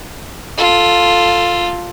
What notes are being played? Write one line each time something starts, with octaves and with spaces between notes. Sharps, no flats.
F4 A4